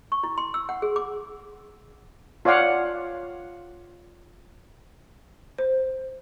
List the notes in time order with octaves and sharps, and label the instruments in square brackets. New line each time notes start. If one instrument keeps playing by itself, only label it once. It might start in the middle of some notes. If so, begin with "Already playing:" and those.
[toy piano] C#6
E4
C6
E6
F#5
G#4
D6
[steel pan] F4 C#5 D5 F5 F#5 D6
[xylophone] C5